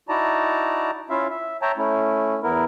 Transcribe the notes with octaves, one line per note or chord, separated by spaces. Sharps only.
D#4 E4 F#4 D5 A5 A#5
C#4 E4 F4 E5 F5
E5
C#5 E5 G5 A5 A#5
A3 C#4 E4
E2 B3 E4 A#4